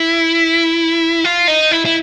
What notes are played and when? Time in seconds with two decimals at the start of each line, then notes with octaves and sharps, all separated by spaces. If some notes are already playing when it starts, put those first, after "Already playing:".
Already playing: E4
1.24 F4
1.48 D#4
1.71 E4
1.85 E4